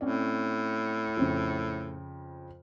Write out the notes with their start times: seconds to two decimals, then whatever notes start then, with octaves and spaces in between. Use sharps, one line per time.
0.01 A2 C4 C#4 D5
1.17 F2 C#3